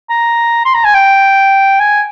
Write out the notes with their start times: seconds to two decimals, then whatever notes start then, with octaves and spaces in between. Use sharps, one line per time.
0.10 A#5
0.65 C6
0.74 A#5
0.84 G#5
0.94 G5
1.80 G#5